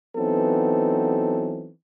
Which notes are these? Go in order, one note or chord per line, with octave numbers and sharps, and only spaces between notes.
E3 F#3 B3 C4 D#4 A4